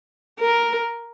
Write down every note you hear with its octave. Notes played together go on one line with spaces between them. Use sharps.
A#4